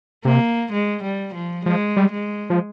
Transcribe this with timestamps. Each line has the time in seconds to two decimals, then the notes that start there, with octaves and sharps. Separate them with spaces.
0.25 C3 A#3
0.72 G#3
1.03 G3
1.34 F3
1.65 F3 G#3
1.97 G3
2.12 G#3
2.50 F3